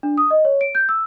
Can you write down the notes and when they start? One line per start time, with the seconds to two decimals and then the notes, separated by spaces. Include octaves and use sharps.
0.03 D4
0.18 D#6
0.31 D#5
0.45 C#5
0.61 D7
0.75 G6
0.89 E6